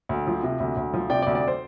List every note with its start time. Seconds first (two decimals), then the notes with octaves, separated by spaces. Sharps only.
0.09 D2
0.27 F3
0.43 C3
0.60 D2
0.77 D2
0.94 F3
1.10 C3 D5 G5
1.22 D5
1.27 D2
1.35 D5
1.48 C5